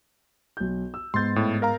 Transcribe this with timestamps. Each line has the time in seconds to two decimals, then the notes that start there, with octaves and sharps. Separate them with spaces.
0.57 B1 G6
0.94 E6
1.14 G#2 B3 C6 G6 A6
1.36 A2
1.62 A#4 F5 A#5